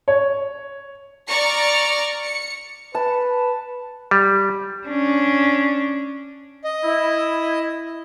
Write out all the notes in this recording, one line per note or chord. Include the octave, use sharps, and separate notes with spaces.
C#5
D5 A#5 C#6 F6 C#7
C#7
B4 A5
G3
C#4 D4
D#5
E4